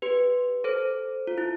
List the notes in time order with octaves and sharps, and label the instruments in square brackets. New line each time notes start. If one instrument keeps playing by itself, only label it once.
[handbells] G4 B4
A4 C5
F4
E4